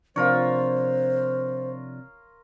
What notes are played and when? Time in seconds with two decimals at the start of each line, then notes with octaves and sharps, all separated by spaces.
0.16 C3 F3 D4 F4 A#4 C5 C#5